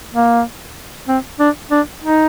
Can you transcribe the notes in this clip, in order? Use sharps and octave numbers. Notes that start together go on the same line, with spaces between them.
A#3
C4
D4
D4
D#4